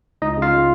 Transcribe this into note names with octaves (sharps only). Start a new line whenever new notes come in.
C#2 D#4 D#5
C#3 F4 F5
G#3